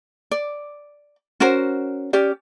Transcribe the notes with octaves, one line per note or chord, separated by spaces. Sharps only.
D5
C#4 F#4 A#4 C5
C#4 G4 D5